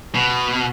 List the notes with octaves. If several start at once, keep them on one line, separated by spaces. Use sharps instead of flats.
B2